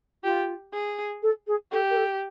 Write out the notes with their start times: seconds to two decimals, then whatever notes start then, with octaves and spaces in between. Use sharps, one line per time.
0.23 F4 G4
0.73 G#4
1.22 A4
1.47 G#4
1.71 G4 A4
1.90 A#4
1.96 A4